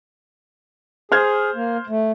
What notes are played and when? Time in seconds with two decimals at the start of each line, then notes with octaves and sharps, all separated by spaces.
1.12 G#4 C5 F6 G#6
1.55 A#3
1.88 A3